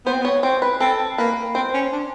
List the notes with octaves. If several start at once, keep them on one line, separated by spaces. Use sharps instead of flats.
B3 C5
C4
B3
C#5
C4 C5
B4
C4 A4
A#3 B4
C4 C5
C#4
D4